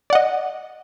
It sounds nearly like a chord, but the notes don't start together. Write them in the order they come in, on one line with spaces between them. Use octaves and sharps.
D5 F#5 D#5